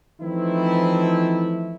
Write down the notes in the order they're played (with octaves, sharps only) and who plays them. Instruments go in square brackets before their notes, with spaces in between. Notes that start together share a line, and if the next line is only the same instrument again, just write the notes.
[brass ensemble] E3 F3 A3 C4 D#4 E4